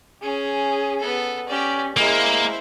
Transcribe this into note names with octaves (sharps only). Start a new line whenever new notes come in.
C#4 G#4
B3 A4
C#4 G4 D5
G#3 A#3 E4 C5